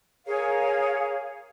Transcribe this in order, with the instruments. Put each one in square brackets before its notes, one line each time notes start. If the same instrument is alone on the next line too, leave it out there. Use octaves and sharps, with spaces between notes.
[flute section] G#4 A#4 C#5 F5